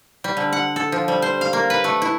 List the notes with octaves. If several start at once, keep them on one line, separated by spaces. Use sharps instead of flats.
G3
D3
F#5
A4
F3
G3
C5
F5
A#3
B4
A3
E4